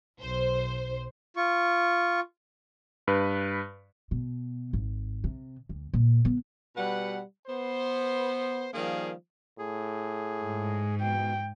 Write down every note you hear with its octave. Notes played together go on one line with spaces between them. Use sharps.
B1 C5
F4 C#6
G2 B4
B2
G#1
C3
D2
A#2
B3
B2 G3 B4 F#5
B3 C5
D#3 F3 G3 A#3 G#4
A2 G#4
G#2
B2 G5